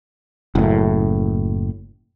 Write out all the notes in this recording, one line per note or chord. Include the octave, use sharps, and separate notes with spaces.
F#1 A2